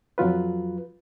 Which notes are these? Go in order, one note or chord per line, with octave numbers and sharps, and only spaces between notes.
F2 F#3 F4 B4